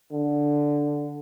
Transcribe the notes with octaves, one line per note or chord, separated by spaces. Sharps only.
D3